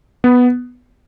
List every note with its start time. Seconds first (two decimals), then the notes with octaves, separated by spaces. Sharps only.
0.24 B3